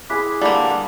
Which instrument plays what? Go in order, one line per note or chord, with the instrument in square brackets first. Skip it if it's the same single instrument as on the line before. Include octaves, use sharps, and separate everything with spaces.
[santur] E4 G#4 C6 [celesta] D6 F#6 B6
[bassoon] D3 [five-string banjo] G3 A#3 [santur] F5 B5